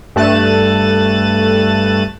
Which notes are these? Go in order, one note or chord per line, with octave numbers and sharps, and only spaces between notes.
G2 A3 F#6 A6 D#7 E7